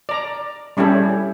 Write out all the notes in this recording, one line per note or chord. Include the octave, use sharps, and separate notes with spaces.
D5 A#5
G3 C#4 E4 G4 A4